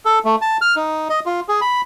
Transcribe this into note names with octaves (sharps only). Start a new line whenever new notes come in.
A4
A3
A5
F6
D#4
D#5
F4
G#4
B5